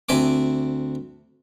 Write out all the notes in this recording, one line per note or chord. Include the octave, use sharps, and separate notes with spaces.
D2 C4 E5 G#5 D6